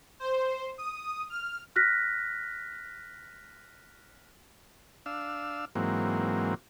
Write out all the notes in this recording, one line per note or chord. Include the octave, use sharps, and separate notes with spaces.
C5
D#6
F6
F6 F#6 A#6 B6
D4 F5 E6
G#2 E3 F#3 A#3 C4